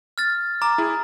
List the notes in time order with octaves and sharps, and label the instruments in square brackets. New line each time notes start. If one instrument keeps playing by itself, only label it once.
[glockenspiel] F6 A6
[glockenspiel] A#5 [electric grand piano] D6
[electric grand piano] E4 G#4